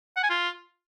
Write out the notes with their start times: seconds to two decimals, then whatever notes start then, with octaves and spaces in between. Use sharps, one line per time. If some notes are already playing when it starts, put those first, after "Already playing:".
0.17 F#5
0.23 G#5
0.30 F4